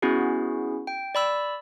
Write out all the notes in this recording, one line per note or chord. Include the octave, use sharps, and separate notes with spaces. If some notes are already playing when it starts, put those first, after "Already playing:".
B3 C#4 E4 F#4 G#4
G5
D5 B5 E6